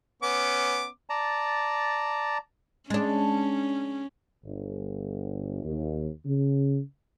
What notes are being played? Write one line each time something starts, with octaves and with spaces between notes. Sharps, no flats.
B3 C#4 D6
D5 A5 A#5
G#3 C#4 D4
G1
D#2
C#3